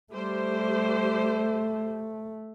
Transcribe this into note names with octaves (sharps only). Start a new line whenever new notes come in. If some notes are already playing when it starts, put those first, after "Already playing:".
G3 A3 G4 C5